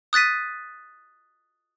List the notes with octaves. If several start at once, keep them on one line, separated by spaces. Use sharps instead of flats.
D#6 F#6 A6 B6 D#7